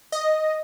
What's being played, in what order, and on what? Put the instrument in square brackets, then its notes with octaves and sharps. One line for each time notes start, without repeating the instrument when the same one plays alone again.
[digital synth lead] D#5